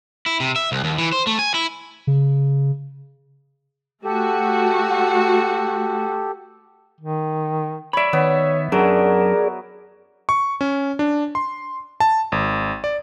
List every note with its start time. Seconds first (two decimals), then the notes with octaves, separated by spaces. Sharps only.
0.26 E4
0.40 C3
0.56 E5
0.72 C2
0.84 D#2
0.98 E3
1.12 C5
1.27 A3
1.39 G#5
1.54 E4
2.07 C#3
4.05 A3 F#4 G4 A4
7.00 D#3
7.93 C#5 D5 E5 B5
8.13 D#3 B3 C#5
8.72 F#2 F#3 D4 G#4 A#4 D5
10.29 C#6
10.61 C#4
10.99 D4
11.35 C6
12.00 A5
12.32 G#1
12.84 D5